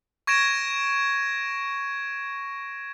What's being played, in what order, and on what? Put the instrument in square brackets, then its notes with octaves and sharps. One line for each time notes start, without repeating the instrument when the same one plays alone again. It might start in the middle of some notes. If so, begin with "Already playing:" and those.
[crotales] C#6 G#6 A#6 D7 E7